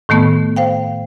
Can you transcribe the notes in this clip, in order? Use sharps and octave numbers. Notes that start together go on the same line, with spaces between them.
A2 D#3 A3 B3
C5 F5 G5